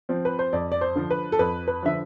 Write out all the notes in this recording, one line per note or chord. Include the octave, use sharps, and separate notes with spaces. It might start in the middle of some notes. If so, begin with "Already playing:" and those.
F3 C4
B4
C5
F2 D5
D5
C5
D3 F3
B4
A4
F2 B4
B4
D3 F3 E5